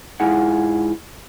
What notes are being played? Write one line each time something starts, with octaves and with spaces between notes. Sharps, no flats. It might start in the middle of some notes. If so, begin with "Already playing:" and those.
G#2 E4 F4 G#4 F#5